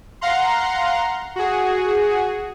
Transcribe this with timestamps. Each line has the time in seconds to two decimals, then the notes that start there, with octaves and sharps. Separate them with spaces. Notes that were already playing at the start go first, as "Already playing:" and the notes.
0.21 F5 F#5 A#5 C6
1.36 F#4 G#4